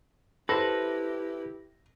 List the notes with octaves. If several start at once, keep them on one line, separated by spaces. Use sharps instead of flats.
E4 G4 A4 B4 C5 A#6